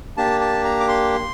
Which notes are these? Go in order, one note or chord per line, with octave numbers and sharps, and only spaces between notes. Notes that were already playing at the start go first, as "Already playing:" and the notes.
A#3 D4 G4 A5
A5
A#5
D6
C6